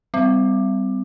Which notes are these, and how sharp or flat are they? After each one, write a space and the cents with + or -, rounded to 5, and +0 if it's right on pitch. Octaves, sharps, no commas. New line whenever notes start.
G3 +0 C4 -35